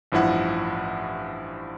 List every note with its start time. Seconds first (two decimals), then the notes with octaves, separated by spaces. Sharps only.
0.12 A1 G2 F3 E4 F#5